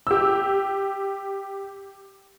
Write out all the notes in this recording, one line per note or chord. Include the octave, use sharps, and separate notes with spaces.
G4 E6